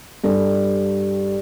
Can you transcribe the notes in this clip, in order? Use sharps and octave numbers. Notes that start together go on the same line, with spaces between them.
G2 A4